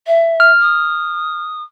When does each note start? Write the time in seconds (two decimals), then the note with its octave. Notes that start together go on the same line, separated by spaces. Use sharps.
0.07 E5
0.40 F6
0.61 D#6